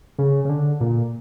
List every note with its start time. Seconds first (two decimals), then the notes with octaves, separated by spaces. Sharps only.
0.19 C#3
0.45 C#3
0.49 D3
0.81 A#2